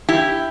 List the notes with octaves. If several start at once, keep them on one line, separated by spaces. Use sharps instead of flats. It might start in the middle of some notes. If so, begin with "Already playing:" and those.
E4 G4